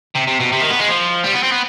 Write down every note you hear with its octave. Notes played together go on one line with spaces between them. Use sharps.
C3
C3
B2
C3
D#3
B3
G#3
F3
G3
B3
C4
B3